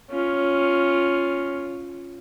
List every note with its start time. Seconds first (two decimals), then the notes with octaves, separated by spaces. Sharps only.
0.10 C#4 F4